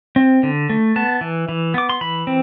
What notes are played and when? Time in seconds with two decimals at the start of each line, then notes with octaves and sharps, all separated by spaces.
0.16 C4
0.43 D3
0.70 A3
0.96 B3 A5
1.21 E3
1.49 E3
1.74 B3 D6
1.90 C6
2.01 E3 B5
2.27 C4